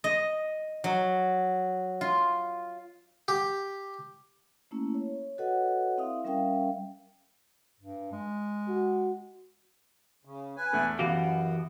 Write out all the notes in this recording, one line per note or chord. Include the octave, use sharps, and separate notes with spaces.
D#5
F#3
F4
G4
A3 A#3 C#4 E4
C#5
F#4 A4 B4 C#5 D#5 F#5
C4 E4 E5 F5 D#6
G3 C#4 A#4 E5 F5 G5
G2
G#3
F#4
C#3
B4 G#5
E2 A3
F#2 E3 B3 F#4 G4 F5